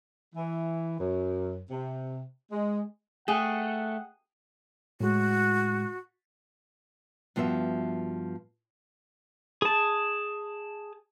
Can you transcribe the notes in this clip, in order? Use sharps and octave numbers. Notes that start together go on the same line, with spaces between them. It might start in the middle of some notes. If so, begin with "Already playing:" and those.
E3
F#2
C3
G#3
A3 G#4 F#5 G5
A2 G#3 F#4
G2 F3 B3 F#4 E5
G#4 A5